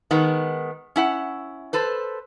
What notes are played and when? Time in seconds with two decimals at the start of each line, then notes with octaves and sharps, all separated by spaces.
0.11 D#3 G#3 B3
0.96 C#4 E4 F#5
1.73 A4 B4 C5